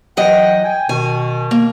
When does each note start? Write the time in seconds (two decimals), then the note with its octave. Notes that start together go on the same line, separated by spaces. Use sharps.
0.17 E3 F#3 D#5 F#5 G5
0.64 G5 G#5
0.89 B2 D#3 G#5
1.51 A#3